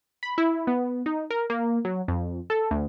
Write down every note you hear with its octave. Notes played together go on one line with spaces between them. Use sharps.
B5
E4
B3
D#4
A#4
A#3
F#3
F2
A4
D2